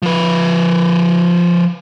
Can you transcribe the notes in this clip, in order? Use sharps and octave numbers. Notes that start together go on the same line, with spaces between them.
F3 B4